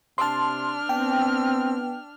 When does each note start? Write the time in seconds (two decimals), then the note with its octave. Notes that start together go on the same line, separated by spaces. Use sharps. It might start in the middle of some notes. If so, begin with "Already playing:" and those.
0.18 C3 D4 A5 C6 F6
0.89 B3 C4 G5